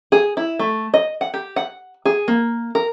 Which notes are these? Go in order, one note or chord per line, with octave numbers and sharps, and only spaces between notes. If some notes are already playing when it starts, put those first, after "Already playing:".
G#4
E4
A3
D#5
F#5
G4
F#5
G#4
A#3
A#4